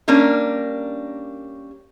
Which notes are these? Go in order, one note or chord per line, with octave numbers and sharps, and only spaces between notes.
G3 A#3 C#4 D4 A#4